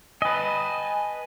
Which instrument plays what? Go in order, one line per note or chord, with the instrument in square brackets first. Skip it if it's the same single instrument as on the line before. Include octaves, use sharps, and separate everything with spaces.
[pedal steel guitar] B4 D#5 [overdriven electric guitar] G#5 A5